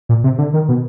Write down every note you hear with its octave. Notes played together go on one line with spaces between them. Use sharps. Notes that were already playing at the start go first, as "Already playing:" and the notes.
A#2
C3
D3
D#3
B2